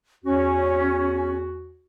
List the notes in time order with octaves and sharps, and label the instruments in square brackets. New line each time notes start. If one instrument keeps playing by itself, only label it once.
[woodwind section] E2 F#4 [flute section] C#4